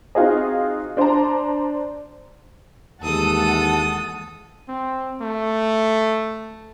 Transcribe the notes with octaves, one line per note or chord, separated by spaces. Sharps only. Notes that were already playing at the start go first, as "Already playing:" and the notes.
C4 D#4 F4 F#4 G#4 D#5
D4 C5 D5 A5 A#5
D#2 E3 G#3 A4 F#5 A5 D#6
C4
A3